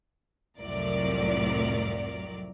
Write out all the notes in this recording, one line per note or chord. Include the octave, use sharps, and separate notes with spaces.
C2 F2 A2 F#3 A#4 D5